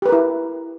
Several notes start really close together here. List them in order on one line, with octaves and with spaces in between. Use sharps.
G4 B4 A#4 E4